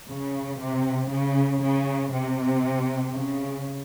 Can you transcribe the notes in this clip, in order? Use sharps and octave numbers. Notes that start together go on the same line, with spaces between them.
C#3
C3
C#3
C#3
C3
C#3